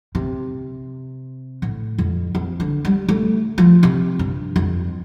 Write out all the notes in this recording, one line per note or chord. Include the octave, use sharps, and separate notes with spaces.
C3
A2
F2
F2
D3
G3
A3
F3
C3
G2
F2